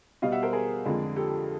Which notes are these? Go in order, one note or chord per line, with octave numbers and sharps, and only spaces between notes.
B2 G3 D#5 F5
E5 F#5
A#4 C5
G#4 A#4
F2 D3 F3 G#3
G4 A4